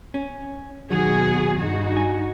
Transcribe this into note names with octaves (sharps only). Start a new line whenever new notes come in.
C#4
D#2 B2 D#3 F#3 F#4 G#4
G2 D#4 F#4
G#5